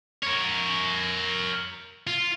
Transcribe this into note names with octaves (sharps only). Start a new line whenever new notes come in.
A#4 C#5
F4